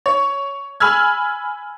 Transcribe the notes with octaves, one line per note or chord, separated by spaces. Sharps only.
C#5
G#5 B5 E6 F6 G#6